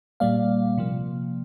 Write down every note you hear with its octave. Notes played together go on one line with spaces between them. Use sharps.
A#2 G3 A#3 D5 F5
C3 F3 A#3